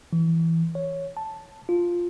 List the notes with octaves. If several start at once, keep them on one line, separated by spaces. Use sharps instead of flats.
E3
C#5
A5
F4